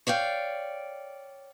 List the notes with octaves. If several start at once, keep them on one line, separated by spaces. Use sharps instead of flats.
C#5 D5 F5 G5